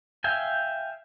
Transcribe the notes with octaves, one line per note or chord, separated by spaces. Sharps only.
E5 F5 G5 G#5